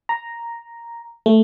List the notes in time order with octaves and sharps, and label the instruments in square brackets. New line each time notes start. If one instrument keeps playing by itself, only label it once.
[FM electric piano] A#5
A3